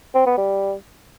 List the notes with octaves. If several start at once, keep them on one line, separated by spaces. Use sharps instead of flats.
C4
B3
G3